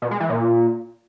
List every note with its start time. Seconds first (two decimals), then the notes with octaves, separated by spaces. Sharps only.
0.02 B2
0.11 G#3
0.20 E3
0.30 A#2